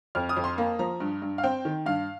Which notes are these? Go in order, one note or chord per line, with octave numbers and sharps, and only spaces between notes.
F2 F6
D#6
F2
C6
A#3
F3 A#5
G2
G2
F5
C4 G5
D#3
G2 F5